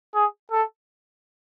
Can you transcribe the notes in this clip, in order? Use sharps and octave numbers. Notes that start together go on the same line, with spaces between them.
G#4
A4